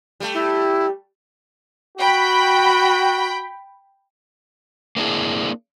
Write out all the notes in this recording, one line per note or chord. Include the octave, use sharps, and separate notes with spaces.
G3 A3
E4
F#4 G5 B5
A#3 C4 D4 E4 G#4